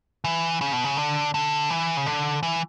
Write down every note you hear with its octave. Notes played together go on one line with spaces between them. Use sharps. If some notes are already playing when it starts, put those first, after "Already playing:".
E3
C#3
B2
C#3
D3
D3
E3
C#3
D3
E3